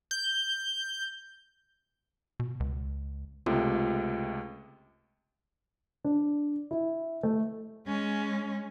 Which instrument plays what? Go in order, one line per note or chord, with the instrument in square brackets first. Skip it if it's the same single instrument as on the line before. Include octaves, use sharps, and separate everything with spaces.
[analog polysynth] G6
[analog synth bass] B2
C#2
[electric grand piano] C#2 C3 A3 [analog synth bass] F4
[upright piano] D4
E4
A3
[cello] G#3 C#4